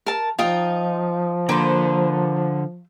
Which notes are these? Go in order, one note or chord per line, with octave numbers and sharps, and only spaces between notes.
A#4 A5
F3 D#4 F4 G5 D#6
D3 A#3 B4 C5